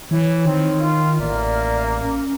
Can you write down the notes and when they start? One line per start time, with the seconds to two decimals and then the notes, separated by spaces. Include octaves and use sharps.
0.11 E3 C#5
0.46 D#3 C4
0.80 F4
1.20 A1 A#3 D5 E5 F6
2.02 C#4